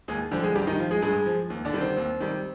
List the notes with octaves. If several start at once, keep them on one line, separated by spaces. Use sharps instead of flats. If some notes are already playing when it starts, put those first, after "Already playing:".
D#2 G#3 G#4
D3 F3 G3 G4
G#3 G#4
G2 G3 G4
D#3 D#4
F3 F4
G#3 G#4
G2 G#3 G#4
F3
D#2
D3 D4
D#3 G3
C4
D#2
D#3 G3